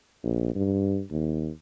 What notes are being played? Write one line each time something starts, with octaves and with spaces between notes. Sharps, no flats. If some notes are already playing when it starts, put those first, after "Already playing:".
A#1
G2
D#2